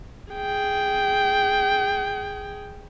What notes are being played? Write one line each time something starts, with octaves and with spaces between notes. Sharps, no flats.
G#4 G5